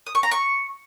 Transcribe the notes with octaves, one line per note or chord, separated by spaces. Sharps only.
D#6
C#6
A#5
C#6